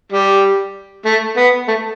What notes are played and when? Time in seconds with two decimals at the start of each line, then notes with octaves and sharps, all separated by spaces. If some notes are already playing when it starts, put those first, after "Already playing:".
0.12 G3
1.06 A3
1.37 B3
1.68 A3